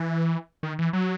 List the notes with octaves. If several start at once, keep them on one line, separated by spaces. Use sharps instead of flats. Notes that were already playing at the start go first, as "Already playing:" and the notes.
Already playing: E3
D#3
E3
F#3